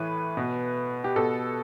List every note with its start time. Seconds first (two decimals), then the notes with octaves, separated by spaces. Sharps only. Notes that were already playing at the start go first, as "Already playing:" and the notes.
Already playing: A2 E3 B4
0.37 B2
1.04 G4
1.16 B2 A4